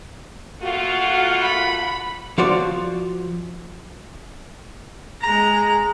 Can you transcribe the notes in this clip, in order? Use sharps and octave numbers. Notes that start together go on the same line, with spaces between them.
A3 A#3 F4 F#4 F#5
B5
F3 F4 F#4 C5 D5
G#3 A#5